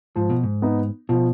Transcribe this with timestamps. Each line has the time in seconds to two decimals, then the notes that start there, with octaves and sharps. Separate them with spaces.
0.16 G#2 F3
0.30 B2
0.43 G#2
0.62 B3 D#4
1.09 B2 F3